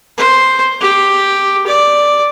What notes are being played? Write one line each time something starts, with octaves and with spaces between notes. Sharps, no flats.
C5
G4
D5